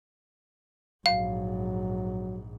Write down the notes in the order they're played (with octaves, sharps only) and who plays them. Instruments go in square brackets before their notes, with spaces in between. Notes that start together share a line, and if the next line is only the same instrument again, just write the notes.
[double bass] A#1 G#2 [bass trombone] F#3 [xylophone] F5